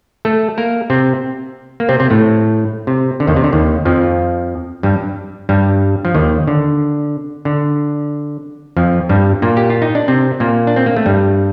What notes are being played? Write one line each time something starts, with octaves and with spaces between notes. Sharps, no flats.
A3 A4
A#3 A#4
C3 C4
A#3
C3 C4
C3 C4
A2 A3
C3
D3
D#2 D#3
C3
D3
D#2 D#3
F2 F3
G2 G3
G2 G3
F3
D#2 D#3
D3
D3
F2 F3
G2 G3
A#2 A#3
G4
F4
D#4
D4
C3 C4
A#2 A#3
D4
C4
A#3
A3
G2 G3